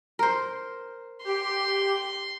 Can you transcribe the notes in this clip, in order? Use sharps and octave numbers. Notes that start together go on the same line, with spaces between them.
A#4 C5
G4 C6